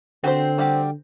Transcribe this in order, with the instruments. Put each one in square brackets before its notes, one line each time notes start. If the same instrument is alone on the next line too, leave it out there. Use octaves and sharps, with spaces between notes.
[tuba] D3 [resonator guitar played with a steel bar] C4 [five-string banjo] F#4 G4 C5
[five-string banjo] G3 F#4 G4